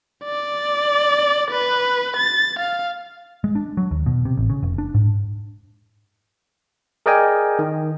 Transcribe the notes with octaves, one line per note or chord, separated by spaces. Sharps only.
D5
B4
A6
F5
G#3
D4
F#3
D#2
B2
C3
A1
C#3
F1
D4
G#2
G#4 A#4 D5 D#5 G5 G#5
D#3